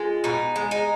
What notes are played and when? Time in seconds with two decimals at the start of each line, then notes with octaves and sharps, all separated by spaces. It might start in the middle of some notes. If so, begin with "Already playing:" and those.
Already playing: G#3 F4
0.24 B2 D#4
0.56 G#3
0.71 D#4